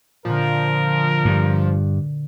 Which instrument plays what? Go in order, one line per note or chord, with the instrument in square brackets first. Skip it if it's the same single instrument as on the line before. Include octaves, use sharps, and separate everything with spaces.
[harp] A#2 D3 [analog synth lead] F3 [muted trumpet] A#4
[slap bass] G2